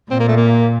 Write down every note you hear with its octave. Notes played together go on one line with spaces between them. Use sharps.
A#2 C4
A#3
A3
A#3